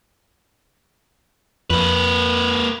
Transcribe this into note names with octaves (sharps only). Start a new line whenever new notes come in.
F2 A#3 B4